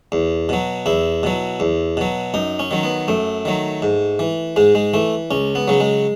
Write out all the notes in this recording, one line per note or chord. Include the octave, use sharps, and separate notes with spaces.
E2
B2 F#3
E2 E4
B2 F#3
E2
B2 F#3
F#2 D#4
C#4
D#3 F#3
B3
F#2 A3
D#3 F#3
G#2
E3
G#2 G#3
G#3
E3 A3
C#2 C#4
B3
C#3 F#3
G#3